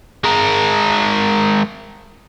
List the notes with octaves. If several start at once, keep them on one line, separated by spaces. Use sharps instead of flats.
G#3 A#4